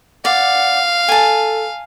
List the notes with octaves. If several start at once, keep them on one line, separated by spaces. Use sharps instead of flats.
D5 F5 F#5
A4 G#5 A5